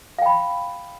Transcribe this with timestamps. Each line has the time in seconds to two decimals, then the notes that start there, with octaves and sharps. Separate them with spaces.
0.19 F5
0.22 G5
0.26 B5